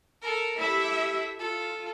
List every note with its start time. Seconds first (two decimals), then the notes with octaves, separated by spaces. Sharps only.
0.22 A4 A#4
0.59 E4 G4 A4 E5
1.39 F4 A4